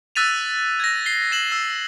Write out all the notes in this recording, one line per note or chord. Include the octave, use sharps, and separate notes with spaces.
E6 F#6 A6 B6 D#7 F7
G#6 A#6
C7 G7
A#6 E7 F#7
E6